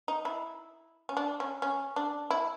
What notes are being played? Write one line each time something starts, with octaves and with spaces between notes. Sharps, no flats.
D#4
E4
C#4
D4
C#4
C#4
D4
E4